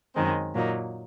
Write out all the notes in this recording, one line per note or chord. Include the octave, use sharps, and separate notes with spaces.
F#2 D#3 G#3 C4
A#2 F#3 A#3 D#4